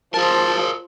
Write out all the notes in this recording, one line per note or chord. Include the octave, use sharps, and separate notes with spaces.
F3 G#4 A#4 A5